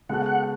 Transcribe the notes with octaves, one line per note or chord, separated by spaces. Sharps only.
C#3 G#3 B3 F#4 A4 F#5
F#5